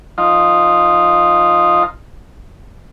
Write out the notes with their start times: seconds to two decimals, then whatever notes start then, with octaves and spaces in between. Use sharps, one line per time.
0.18 F3 D#4 F4